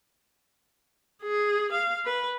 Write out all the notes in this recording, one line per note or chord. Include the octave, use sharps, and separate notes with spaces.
G#4
F5
B4